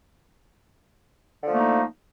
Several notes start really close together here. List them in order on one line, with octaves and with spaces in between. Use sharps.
D3 F3 A3 A#3 D#4